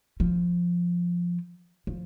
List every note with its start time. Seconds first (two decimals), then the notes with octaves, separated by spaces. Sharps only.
0.20 F3
1.87 F3